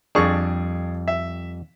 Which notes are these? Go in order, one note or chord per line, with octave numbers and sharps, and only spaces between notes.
F2 G3 D4 G#4 C#6
E5